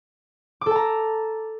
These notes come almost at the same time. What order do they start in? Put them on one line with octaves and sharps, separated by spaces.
D6 A4 A5 A#5